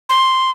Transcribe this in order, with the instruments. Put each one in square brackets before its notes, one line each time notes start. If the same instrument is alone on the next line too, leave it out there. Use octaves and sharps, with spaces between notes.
[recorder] C6